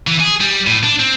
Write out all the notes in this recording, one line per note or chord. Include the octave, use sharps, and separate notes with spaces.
E3
G#4
G3
A2
D4
C4